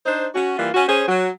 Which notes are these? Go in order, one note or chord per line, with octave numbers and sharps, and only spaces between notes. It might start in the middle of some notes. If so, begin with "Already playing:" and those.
D4 D#4 C5
C#4 F#4
E3 G3 A#3 F4
C#4 F#4
C#4 G#4 C5 C#5
F#3